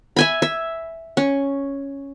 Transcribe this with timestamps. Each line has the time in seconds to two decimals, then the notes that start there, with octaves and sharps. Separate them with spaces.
0.16 E5 G#5 B5
0.42 E5
1.17 C#4